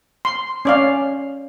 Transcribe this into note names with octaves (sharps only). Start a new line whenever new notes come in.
C6
C#4 D5 F5